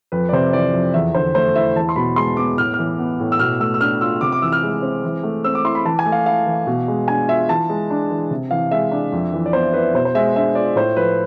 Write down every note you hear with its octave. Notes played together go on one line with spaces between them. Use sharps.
F2 B4
D5
C3 C5
E3 D5
F2
E2 E5
D3 C5
A3 C5
E4 E5
E2 A5
C6
B2 B5
G#3 C6
B3 D6
A2 F6
E3 F6
B3
A2
E6
B2 F6
A3 E6
E6
D4 F6
F4 E6
C3 D6
D6
E3 E6
F6
G#3
C4
E3
A3
C4 E6
D6
E4 C6
B5
E3 A5
G#5
A3
F5
E4 F5
E3
B2
G#3
D4 G#5
F4 E5
E3 A5
G#3
D4
E3
C3
E3 F5
G#3 E5
D4
F2
E3
D5
B3 C5
E4 B4
B2 C5
C5
G#3 E5
D4 E5
F4 D5
A2 C5
F3 B4